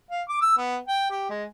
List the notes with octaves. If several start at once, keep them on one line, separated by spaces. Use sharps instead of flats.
F5
D6
E6
B3
G5
G4
G#3